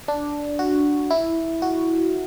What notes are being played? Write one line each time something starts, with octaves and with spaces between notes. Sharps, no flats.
D4
F#4
E4
F#4